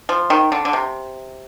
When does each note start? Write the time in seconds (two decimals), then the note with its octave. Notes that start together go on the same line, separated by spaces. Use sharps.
0.09 F3
0.30 D#3
0.52 D3
0.65 D3
0.73 C3